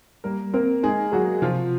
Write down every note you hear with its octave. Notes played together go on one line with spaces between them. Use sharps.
G3 A#3 A#4
A#3 C4 A#4
G#3 D#4 G#4
F#3 F#4 G#4
C3 F3 F4